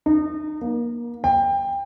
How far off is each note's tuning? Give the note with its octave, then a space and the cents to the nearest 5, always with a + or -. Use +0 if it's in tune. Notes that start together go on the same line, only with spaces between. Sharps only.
D#4 -30
A#3 +30
G5 +20